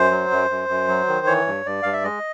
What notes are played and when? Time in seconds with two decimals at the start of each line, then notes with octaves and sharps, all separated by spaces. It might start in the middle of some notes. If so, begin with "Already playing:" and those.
Already playing: F#2 C5
0.11 F#3
0.31 F#2
0.50 F#2
0.69 F#2
0.88 F#3
1.08 D#3
1.27 E3 C#5
1.47 G2
1.66 G2 D5
1.83 G2 F5
1.93 E5
2.04 G#3 D#5